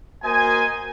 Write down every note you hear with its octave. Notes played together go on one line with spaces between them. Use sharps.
A#3 F#4 A#4 C5 D#5 G#5